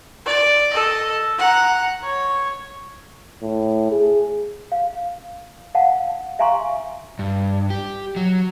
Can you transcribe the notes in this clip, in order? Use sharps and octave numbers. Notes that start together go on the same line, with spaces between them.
D5
A4 D#5
F#5 A#5
C#5
A2
G#4
F5
F5 F#5 A5
E5 F5 G#5 A#5 C6 C#6
G2
G4
F#3